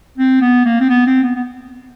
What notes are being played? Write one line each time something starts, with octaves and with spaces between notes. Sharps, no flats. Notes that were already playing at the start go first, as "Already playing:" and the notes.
C4
B3
A#3
C4
B3
C4
B3
B3